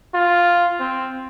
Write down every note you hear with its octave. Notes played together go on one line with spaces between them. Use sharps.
F4
C4